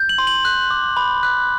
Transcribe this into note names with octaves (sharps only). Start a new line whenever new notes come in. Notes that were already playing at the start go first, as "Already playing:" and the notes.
Already playing: G6
F#7
C6
F#7
F#6
D6
B5
F#6